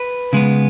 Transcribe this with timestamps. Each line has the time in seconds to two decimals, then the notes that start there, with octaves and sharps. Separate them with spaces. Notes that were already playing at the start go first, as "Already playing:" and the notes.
Already playing: B4
0.33 C#3 G#3 B3